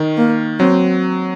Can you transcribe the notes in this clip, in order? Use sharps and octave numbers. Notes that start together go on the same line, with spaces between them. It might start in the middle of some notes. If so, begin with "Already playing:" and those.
Already playing: D#3
A#3
F#3 C4